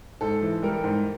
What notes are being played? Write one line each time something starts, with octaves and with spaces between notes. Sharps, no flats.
G#2 A4
E3
G3 A#4
G#2